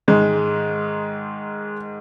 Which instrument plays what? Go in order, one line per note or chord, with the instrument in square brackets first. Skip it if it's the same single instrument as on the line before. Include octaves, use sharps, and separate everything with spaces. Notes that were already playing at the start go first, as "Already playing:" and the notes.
[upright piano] G#2 D#3 G#3